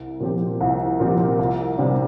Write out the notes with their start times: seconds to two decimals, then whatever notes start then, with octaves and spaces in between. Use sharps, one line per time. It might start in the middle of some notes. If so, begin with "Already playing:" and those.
Already playing: C2
0.20 A#2 F3 C4 G4
0.60 C2
1.00 A#2 F3 C4 G4
1.39 C2
1.78 C3 G3 D4